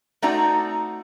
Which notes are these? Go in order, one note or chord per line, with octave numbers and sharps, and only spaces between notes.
A3 C4 D#4 F#4 D5 A#5